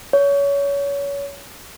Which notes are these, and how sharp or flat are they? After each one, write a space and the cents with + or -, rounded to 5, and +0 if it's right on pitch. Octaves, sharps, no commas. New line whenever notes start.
C#5 +25